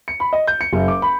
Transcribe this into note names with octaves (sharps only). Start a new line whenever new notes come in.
C#7
B5
D#5
G6
C#7
F#1
D6
B5